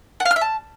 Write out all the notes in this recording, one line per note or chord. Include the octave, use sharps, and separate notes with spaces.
F#5
F5
F6
E5
A5